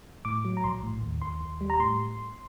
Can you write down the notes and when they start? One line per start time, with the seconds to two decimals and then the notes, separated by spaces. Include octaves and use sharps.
0.25 A2 D6
0.45 F#3
0.57 A#5
0.64 A#1 C6
0.83 A2
1.02 D#2
1.22 D#2 C6
1.41 D#2
1.61 G3
1.70 A#5
1.80 A2 C6